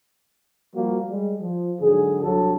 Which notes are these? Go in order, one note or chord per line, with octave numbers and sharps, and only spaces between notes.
F3 G3 A#3 F#4
G3 G#3
F3
G#2 D3 F#3 G#4
C2 F#3 D4 G4 A4